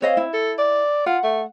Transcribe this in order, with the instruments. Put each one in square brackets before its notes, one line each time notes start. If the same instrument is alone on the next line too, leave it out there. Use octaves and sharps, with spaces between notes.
[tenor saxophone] C4 [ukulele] C#5 D#5 F5
[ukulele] E4
[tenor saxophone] A4
D5
[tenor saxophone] F4 [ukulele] F#5
[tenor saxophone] A3